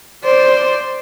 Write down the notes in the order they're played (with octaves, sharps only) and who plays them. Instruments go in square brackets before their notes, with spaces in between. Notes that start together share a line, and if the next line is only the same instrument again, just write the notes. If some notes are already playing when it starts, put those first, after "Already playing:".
[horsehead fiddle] C5 D5